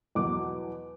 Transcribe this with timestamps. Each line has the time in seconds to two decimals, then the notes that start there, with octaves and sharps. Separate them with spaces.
0.15 E2 B2 F#3 D6